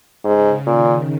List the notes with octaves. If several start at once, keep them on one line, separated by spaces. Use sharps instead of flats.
G#2 C#3
A#2 D#3